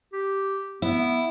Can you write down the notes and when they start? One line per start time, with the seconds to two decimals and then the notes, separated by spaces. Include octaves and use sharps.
0.13 G4
0.82 B3 E4